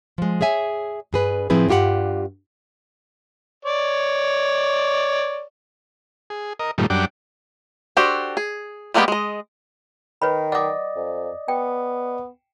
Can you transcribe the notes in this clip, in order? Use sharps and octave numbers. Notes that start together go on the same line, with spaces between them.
F3 G#3
G#4 C#5 E5 G#5
G2 G#4 B4
A2 F3 C4 E4 G#4 B4
G2 F4 G4 A4 F#5
C#5 D5
G#4
A#4 D#5
G2 A#2 D#3 F3 G3 A3
F#2 G3 D4 F#5 G5 D6
D4 F#4 G4 A4 C5
G#4
G3 G#3 A#3 B3 G4
G#3 D#5
D#3 B4 C#5 B5
D5 D#5 F#5 D6
F2
B3 G5